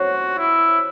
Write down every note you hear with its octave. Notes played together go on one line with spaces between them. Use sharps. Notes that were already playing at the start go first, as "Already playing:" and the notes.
Already playing: F#4 C5 C#5
E4